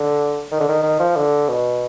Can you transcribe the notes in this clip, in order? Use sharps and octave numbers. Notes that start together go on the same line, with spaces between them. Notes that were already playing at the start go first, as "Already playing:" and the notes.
Already playing: D3
D#3
D3
D#3
D#3
F3
D3
B2